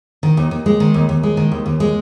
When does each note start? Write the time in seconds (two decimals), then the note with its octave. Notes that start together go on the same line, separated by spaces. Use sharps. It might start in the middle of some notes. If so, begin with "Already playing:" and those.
0.23 D#3
0.37 D#2
0.51 D#2
0.66 G#3
0.80 D#3
0.94 D#2
1.09 D#2
1.23 G#3
1.37 D#3
1.52 D#2
1.66 D#2
1.80 G#3